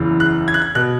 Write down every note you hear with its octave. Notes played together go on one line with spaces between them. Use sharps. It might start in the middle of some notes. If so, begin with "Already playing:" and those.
Already playing: F#1 E2 C#3 E3
F#6
G#6
F#6
G#6
B2 F#6